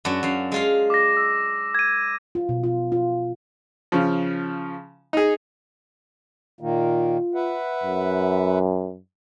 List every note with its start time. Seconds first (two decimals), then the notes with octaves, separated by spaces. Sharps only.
0.05 F#2 D4 F#4
0.23 F#2 F5
0.52 G#3 F4 F5
0.90 D6 A#6
1.17 E6
1.75 G#6 D#7
2.35 F4
2.49 B2
2.63 F4
2.92 F4
3.92 C#3 F3
5.13 D#4 G#4
6.61 A#2 D#3 A#3 F4
7.35 B4 E5 F#5
7.83 F#2